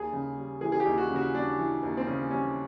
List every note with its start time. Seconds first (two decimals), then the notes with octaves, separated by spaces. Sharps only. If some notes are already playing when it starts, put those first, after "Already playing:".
Already playing: D#2 G#4
0.13 C#3
0.37 G3
0.61 E3 G#4
0.72 G#4
0.80 G4
0.86 D#2
0.98 F#4
1.10 C#3
1.16 F#4
1.34 G3 D4
1.58 E3
1.83 D#2
1.97 C4
2.07 C#3 C#4
2.31 G3 C#4